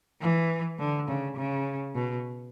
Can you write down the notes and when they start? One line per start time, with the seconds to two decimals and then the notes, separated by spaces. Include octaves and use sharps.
0.21 E3
0.79 D3
1.08 C#3
1.36 C#3
1.94 B2